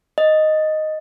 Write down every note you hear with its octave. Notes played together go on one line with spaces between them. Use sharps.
D#5